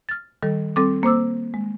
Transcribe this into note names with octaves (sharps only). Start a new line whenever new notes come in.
F6 A6
D#3 G3 A4
G3 C4 A4 D6
A#3 C5 D6 E6
G#3